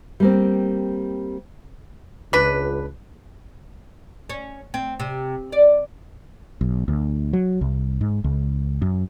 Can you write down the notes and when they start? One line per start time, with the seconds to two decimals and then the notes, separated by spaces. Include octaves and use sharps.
0.20 G3 A#3 C4
2.33 C#2 D4 B4
4.29 C#4
4.74 C4
5.00 C3
5.52 D5
6.61 B1
6.88 D2
7.33 F#3
7.61 C2
8.01 G#2
8.24 C#2
8.82 F#2